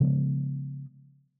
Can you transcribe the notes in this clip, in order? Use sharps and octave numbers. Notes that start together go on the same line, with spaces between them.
C#3 F3 G#3 B3